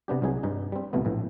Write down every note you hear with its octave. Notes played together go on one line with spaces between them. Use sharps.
C3 B3 D4 G4
C2 F#3 D#4 G#4
G2 D#4
G3 C4
C2 B2 A3 B3
A#1 A2